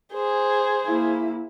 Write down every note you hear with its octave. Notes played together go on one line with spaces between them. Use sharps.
G#4 C5
A#3 E4